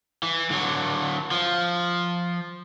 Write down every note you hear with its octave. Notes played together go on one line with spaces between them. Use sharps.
E3
D3 F#3
F3